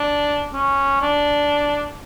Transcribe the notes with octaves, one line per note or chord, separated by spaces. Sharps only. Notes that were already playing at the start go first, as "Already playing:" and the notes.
Already playing: D4
C#4
D4